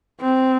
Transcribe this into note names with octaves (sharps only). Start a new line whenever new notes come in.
C4